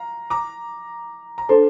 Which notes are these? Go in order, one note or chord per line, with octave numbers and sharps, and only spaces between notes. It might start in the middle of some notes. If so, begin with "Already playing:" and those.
Already playing: F5 A#5
A#5 D6
A#5
D4 A4 C5 A5 C6